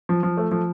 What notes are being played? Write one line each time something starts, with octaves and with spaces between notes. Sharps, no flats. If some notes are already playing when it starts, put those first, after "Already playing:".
F3
F3
A3
F3